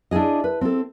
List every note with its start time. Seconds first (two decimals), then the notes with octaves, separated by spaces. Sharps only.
0.11 D4 E4 F4 G#4 D#5
0.44 B4
0.61 C4 A4